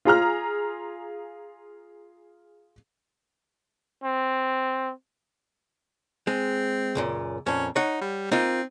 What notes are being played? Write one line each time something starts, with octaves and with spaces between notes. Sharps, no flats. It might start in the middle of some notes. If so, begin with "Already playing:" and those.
F4 G#4 A#5 F6
C4
G#3 C4
C#2 F#2 A#2
F2 A#2 C#4
D#4 C#5 F#5
G3
A#3 C4 D#4 F4